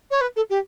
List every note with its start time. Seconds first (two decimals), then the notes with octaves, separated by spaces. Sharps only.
0.11 C#5
0.21 B4
0.36 A4
0.50 G4